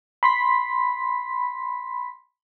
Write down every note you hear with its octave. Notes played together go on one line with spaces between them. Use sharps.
B5 C6 B6